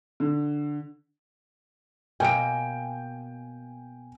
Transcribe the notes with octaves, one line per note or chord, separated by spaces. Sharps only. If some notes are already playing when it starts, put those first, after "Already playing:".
D3
B2 A#3 A#4 G5 G#5 D7